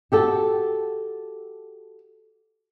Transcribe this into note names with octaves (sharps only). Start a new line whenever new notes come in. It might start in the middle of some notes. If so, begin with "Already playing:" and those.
F#4 G4 A4